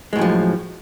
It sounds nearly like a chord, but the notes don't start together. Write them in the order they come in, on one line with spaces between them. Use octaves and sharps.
G#3 A2 F#2 F3